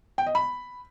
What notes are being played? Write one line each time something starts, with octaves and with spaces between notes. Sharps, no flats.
G5
D#5
B5